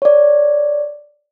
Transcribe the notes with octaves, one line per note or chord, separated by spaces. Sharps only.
C#5 D5